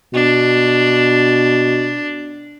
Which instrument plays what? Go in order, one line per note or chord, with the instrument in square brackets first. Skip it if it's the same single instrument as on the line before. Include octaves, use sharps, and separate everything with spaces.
[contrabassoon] B2 [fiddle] D4